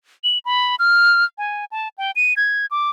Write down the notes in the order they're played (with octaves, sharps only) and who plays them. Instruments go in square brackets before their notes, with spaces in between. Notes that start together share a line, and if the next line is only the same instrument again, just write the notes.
[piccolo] F#7
B5
F6
G#5
A5
G5
D#7
G#6
D6